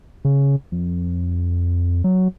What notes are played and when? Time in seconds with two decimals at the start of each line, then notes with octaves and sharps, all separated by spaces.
0.25 C#3
0.72 F2
2.04 F#3